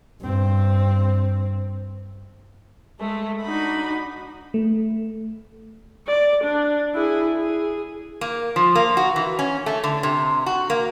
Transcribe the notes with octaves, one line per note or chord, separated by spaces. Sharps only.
G2 C4
G#3 A3 A4
D4 D#4 F#4 B5
A3
D5
D4
E4 G#4
G#4
A#3
F3
A#3
F#4
E3
C#4
A3
D3
C3
F#4
A#3